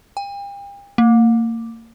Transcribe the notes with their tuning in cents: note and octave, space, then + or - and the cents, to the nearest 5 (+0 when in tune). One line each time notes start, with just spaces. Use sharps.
G5 +40
A#3 -35